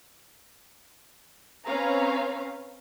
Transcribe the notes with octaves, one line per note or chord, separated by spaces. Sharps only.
C4 C#4 B4 C#5 F5 A#5